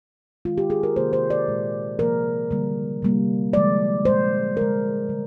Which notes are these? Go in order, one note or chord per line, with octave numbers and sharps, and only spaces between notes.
D#3 G#3 F4
G4
G#4
A#4
C3 D#3 A#3 C5
C5
D5
A#2 G#3
C3 F3 A#3 A#4
D3 G3 A#3
C3 G3 A#3
D3 F3 G#3 D5
A#2 G#3 C5
D3 G#3 A#4
D3 G3